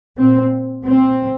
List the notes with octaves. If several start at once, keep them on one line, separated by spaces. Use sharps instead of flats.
A#2 C4
A#2 C4